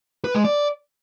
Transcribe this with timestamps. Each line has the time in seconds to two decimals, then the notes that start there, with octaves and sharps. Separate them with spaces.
0.24 B4
0.34 G#3
0.44 D5